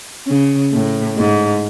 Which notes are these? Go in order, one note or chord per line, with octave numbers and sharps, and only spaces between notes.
C#3
A2
G#2